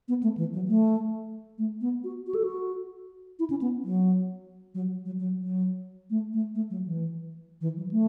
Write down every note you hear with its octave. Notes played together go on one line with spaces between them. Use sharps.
B3
A3
E3
F#3
A3
A3
B3
F#4
F#4
A4
F#4
E4
C#4
B3
F#3
F#3
F#3
F#3
F#3
A3
A3
A3
F#3
E3
E3
F#3
A3